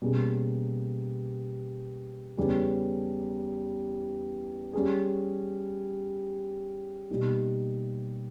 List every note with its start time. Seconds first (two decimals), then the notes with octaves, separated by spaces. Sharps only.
0.02 B2 G3 A#3 C#4 G#4
2.37 E2 C#3 G3 C#4 G#4
4.73 G3 C#4 G#4
7.10 B2 G3 A#3 D#4 G4